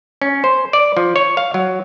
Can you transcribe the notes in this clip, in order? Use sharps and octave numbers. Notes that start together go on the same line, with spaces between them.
C#4
C5
D5
F3
C#5
F5
F#3